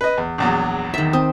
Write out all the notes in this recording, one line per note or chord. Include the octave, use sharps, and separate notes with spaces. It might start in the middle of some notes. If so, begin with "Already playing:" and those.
B4 D#5
E2
A#1 E2 F#3
D#3 E5
C4 D#6